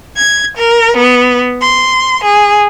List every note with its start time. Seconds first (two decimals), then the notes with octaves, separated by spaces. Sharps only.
0.14 G#6
0.57 A#4
0.96 B3
1.60 C6
2.22 G#4